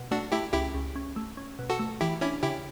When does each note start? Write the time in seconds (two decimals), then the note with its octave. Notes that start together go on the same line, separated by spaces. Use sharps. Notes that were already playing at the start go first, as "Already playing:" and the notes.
Already playing: B2
0.11 A3 D4 F#4
0.32 A3 E4 G4
0.53 C#2 E4 G4
0.74 C#2
0.96 C#4
1.16 A3
1.37 C#4
1.59 B2
1.69 F#4 A4
1.79 A3
2.01 E3 E4 G4
2.21 C#4 D4 E4
2.43 C#3 E4 G4